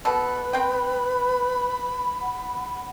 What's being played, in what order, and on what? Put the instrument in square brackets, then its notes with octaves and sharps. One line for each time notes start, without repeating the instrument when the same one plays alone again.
[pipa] B2 A4 [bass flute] B4 [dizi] B5
[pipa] C4 G5
[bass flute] F#5